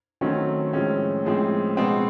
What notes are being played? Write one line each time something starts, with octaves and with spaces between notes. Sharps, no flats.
D#3 F#3 A3 C4 C#4
A2 F3 G#3 C4 C#4
A2 F3 G#3 C4
B2 G#3 B3 C4